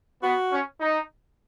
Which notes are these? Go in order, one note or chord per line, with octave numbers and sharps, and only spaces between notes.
B3 F#4
C#4
D#4